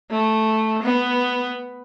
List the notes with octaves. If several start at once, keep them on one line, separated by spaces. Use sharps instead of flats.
A3
B3